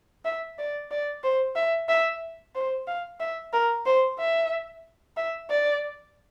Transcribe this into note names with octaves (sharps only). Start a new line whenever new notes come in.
E5
D5
D5
C5
E5
E5
C5
F5
E5
A#4
C5
E5
E5
D5